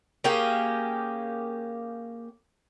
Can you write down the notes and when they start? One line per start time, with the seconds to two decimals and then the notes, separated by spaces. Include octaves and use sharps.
0.24 A#3 C#4 G4 G#4